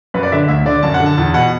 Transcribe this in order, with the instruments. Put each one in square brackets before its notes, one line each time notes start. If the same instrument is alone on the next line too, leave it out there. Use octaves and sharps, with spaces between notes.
[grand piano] F#2 B4
D5
D3 E5
D2 E5
D3 D5
F#2 A5
F#5
D3
A5
E2 A5
B2 F#5